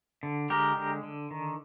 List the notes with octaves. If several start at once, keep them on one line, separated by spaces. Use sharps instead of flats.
D3
G#3 G4 A#4
D3
D3
D#3